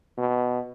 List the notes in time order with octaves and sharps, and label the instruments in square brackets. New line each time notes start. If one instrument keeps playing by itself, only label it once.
[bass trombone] B2